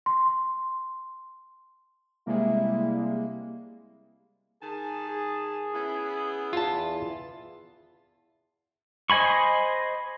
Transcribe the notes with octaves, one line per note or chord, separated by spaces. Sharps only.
C6
C3 G3 G#3 A#3 E4
D#3 G#4 G#5 A5
G#4
B3 C#4 E4
E2 F4 A5
C5 D#5 G#5 B5 C#6